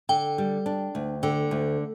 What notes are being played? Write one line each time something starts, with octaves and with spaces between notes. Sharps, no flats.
D3 G5
G3
D4
D2
D3 G5
D2